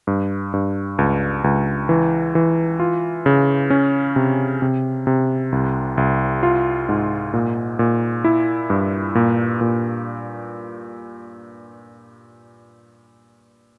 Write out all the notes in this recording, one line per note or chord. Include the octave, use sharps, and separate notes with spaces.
G2
G2
C#2
C#2
E3
E3
F4
C#3
C#4
C3
C3
C3
C2
C2
F4
G#2
A#2
A#2
E4
G2
A#2
A#2